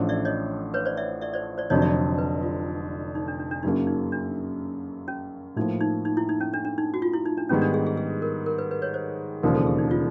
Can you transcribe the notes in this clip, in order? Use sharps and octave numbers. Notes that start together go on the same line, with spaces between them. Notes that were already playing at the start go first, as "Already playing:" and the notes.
Already playing: A1 A2 F3 A3 D4
D5 E5
C#5 D#5
B4 C#5
C5 D5
D5 E5
D5 E5
C5 D5
C5 D5
F1 F2 D3 F#3 C#5 D#5
D5 E5
B4
F4
D#4
D4
D4
D4
F#2 C#3 F#3 A#3 D#4
D#4
D4
C#4
A2 F3 A#3 D#4
D#4
D#4
E4
D#4
C#4
D4
D4
D#4
F#4
F4
E4
D#4
D4
G#2 D#3 G3 B3 C#4
D4
G#4
G#4
G#4
A#4
A#4
B4
B4
B4 C#5
C5
E1 D#2 C#3 F3 A#4
A4
G#4
D#4
F4